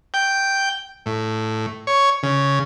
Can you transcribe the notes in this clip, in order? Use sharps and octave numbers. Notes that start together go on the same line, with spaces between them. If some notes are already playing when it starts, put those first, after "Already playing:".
G5
A2
C#5
C#3